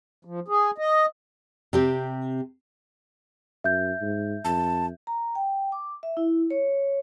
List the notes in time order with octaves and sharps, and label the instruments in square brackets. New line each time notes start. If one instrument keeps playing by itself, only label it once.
[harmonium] F3
G#4
D#5
[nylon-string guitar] C3 C4 G4
[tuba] F#2 [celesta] E5 G6
[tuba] G#2
[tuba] F2 [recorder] A5
[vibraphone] A#5
G5
D6
E5
E4
C#5